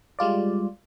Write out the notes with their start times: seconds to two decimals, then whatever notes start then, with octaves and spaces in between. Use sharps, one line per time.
0.19 G3 G#3 F4 D5